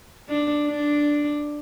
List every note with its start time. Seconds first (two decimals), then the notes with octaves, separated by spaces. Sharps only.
0.29 D4
0.67 D4